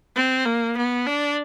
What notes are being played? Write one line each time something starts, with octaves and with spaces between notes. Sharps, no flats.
C4
A#3
B3
D4